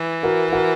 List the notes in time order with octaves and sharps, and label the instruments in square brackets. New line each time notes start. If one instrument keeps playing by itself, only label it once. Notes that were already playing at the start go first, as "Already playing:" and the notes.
Already playing: [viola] E3
[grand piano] F#4 A#4
F#4 A#4